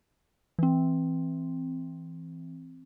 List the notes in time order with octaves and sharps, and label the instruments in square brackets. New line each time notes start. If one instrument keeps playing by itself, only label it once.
[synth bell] E3 C4